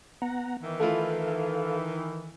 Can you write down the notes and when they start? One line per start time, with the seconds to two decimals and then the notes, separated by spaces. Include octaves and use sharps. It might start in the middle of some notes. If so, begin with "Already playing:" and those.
0.22 B3 F#5 A#5
0.63 D#3 E3
0.80 A3 E4 F4 A4 F5